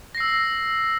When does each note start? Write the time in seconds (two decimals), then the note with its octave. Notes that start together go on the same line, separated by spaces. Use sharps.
0.15 A#6
0.17 C7
0.20 E6